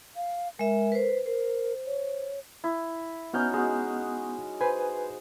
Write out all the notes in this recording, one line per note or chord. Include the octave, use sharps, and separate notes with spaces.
F5
G#3 A#4 E5
B4 C5
A#4 C5
C#5
E4
B3 C#4 D#4 F#4 F6 G6
G#3 F#4
B4 C5 G#5